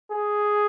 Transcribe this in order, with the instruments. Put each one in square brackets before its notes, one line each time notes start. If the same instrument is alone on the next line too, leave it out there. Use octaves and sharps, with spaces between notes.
[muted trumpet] G#4